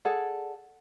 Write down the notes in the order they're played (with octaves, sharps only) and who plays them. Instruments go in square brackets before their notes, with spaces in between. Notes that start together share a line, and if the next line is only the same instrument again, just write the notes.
[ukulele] G#4 A4 D5 F#5